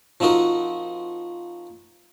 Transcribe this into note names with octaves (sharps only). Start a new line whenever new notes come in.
F3 C4 D#4 F#4 A#4